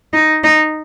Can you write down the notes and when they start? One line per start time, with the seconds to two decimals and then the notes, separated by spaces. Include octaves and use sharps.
0.13 D#4
0.44 D#4